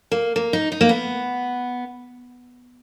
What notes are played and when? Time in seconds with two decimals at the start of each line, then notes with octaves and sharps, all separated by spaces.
0.12 A#3
0.36 A#3
0.53 D#4
0.72 D#4
0.81 A#3
0.89 B3